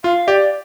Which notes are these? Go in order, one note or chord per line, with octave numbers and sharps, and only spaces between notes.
F4 F5
G4 D5